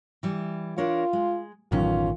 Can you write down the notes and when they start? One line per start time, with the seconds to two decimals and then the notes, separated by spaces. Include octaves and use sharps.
0.23 E3 G3
0.77 D4 F4 A#4 C#5
1.13 G#3
1.72 A1 F#2 B2 D#3 C#4 F4